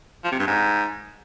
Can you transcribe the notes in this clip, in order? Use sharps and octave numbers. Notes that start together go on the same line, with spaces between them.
F3
C3
G2
G#2